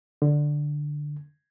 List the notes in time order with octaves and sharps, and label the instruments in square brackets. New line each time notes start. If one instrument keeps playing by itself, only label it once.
[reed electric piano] D3